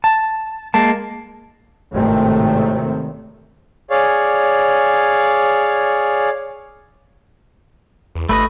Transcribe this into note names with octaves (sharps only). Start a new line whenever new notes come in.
A5
G#3 A#3 A5
G#1 A2 C3 D#3 A3 C4
G#4 C#5 D5 F5
E2
G1 A3 B4 D#5 B5